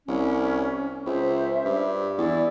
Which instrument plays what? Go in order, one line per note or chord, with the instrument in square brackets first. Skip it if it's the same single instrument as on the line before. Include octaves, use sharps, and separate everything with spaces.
[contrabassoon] C2 [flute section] C#4
[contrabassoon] C#2 [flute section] C5 E5
[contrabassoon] G2
[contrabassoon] E2 [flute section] E4 D5